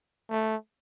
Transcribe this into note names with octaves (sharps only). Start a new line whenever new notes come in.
A3